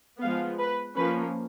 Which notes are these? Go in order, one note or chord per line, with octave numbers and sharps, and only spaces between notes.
F3 G#3 B3 F5
B4
F3 A#3 C#4 B4